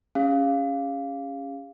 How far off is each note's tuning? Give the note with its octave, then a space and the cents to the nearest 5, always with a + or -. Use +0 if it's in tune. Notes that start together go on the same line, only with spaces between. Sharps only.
C#4 +0 G#4 -45 F5 -5